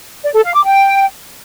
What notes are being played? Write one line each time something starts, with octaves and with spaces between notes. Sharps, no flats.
D5
A4
F5
D6
G5